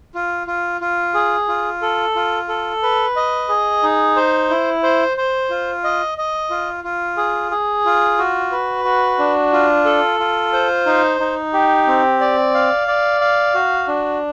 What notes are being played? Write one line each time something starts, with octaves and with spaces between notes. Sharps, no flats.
F4
F4
F4
G#4
F4
A4
F4
A4
B4
D#5
G#4
D#4
C5
E4
C5
C5
F4
D#5
D#5
F4
F4
G#4
G#4
F4
F#4
B4
F#4
D4
F4
A4
F4
C5
D#4
D#4
G4
C4
D5
F5
D5
F5
F#4
D4